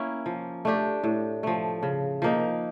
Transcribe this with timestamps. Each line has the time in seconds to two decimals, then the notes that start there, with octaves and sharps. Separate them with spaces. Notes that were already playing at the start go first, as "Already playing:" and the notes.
Already playing: A#3 C#4 E4
0.26 F3
0.65 A3 D4 G4
1.04 A2
1.43 F3 A3
1.83 C#3
2.22 F3 A#3 D#4